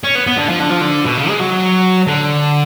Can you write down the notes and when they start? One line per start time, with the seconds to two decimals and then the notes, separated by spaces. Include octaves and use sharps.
0.04 C#4
0.15 B3
0.27 B3
0.37 D3
0.49 F3
0.60 D3
0.70 F3
0.81 D3
1.05 B2
1.17 C#3
1.28 G#3
1.39 F#3
2.07 D3